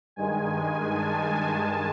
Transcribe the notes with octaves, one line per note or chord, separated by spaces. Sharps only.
G2 D#3 G#3 G#5
A5